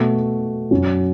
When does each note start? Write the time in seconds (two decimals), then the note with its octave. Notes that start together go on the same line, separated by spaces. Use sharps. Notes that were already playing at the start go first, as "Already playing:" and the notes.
Already playing: B2 A3 F#4
0.71 F#2 F#3 C#4